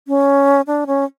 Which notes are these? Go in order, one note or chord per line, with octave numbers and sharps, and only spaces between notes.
C#4
D4
C#4